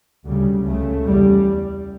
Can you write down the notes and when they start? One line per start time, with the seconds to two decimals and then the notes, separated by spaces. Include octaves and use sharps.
0.25 D2 C#3 G3
0.65 C#2 C#3 A3
1.06 E2 C#3 G3